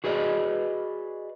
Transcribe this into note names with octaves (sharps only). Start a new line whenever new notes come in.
F#4 G#4 B4 D5 D#5